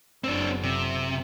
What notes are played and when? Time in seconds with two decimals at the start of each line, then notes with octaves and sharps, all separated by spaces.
0.24 F#1 C4 D4
0.63 C3